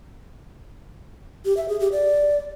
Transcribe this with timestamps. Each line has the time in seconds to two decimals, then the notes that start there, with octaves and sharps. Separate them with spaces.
1.45 G4
1.57 E5
1.69 G#4
1.80 G4
1.92 D5